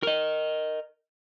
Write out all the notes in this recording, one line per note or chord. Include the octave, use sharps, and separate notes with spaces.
A#4 D#5